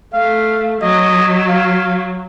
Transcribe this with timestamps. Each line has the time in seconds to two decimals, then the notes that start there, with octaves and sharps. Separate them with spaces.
0.13 A3 F5
0.81 F#3 D#5
1.49 F5